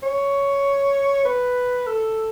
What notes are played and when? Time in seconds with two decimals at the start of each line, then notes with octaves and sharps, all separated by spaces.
0.03 C#5
1.25 B4
1.87 A4